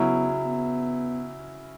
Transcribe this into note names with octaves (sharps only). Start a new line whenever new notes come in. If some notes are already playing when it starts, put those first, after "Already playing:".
Already playing: C#3 F#3 B3 C#4 E4
B3